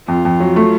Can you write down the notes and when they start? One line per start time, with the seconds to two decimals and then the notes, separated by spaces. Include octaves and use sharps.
0.08 F2 F4
0.25 F2
0.40 F#3
0.56 A3